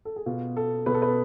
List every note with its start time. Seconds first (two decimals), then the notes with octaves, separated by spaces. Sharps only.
0.05 A4
0.16 G#4
0.26 B2 F4
0.57 A4
0.86 B2 B4
0.94 A4
1.02 B4